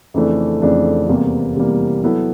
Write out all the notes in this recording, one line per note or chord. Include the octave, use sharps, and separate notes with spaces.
F2 C#3 E3 A3 D4
F2 C#3 E3 A3 D4
E2 C3 E3 G3 A#3
E2 C3 E3 G3 A#3
F#3 B3 E4 A4